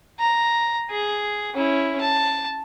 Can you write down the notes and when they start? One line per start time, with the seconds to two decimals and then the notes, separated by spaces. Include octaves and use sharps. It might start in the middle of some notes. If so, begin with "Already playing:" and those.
0.19 A#5
0.91 G#4
1.54 C#4 E4
2.01 A5